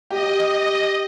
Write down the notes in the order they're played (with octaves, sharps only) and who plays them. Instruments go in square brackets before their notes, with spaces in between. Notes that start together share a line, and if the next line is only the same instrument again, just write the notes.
[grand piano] G4 [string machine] D#5